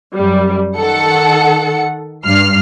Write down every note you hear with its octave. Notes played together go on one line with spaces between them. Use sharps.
F#2 G3
D#3 A4 F#5 C#7
G2 F6 C7